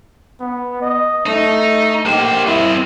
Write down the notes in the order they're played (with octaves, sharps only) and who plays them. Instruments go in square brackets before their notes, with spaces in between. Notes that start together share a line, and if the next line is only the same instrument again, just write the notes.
[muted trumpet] B3
D#5
[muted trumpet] A3 [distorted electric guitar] D#4
[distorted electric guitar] A#3 C5 [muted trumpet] G4
[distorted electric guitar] C4 D#5 [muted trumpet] E4